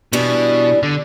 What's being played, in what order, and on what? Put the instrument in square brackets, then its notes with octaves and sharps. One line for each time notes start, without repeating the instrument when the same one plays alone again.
[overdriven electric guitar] B2 [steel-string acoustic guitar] E3 G3 D4
[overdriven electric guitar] D3